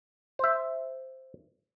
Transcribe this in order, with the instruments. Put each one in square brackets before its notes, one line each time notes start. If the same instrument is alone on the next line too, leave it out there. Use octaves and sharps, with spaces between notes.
[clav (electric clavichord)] C5 E5